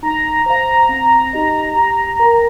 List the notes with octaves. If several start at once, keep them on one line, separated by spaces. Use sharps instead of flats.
D#4 A#5
C5 F5 A#5
C4
D#4 G4 D#5
G4
A#4 G5